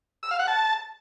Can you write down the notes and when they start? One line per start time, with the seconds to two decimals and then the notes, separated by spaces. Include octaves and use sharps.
0.23 E6
0.31 F5
0.39 F#5
0.48 A5